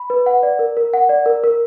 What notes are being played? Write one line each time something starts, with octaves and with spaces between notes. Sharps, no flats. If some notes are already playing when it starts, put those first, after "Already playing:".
Already playing: B5
B4
F#5
D5
A#4
A#4
F#5
D5
A#4
A#4